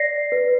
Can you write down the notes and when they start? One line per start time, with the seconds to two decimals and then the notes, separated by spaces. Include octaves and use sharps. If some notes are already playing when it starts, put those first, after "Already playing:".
Already playing: D5 A#6 C7
0.32 B4